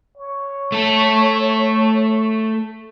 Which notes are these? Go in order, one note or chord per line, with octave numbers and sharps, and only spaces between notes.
C#5
A3 A4